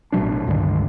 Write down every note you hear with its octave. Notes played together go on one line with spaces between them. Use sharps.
A1 B2 F#3 D4
C#2 G2 D3 D#3